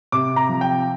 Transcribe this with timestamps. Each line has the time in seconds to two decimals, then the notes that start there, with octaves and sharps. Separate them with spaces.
0.12 C3 D6
0.36 A#5
0.49 F3
0.61 G5